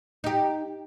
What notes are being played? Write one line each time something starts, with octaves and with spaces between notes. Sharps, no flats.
D#4 G4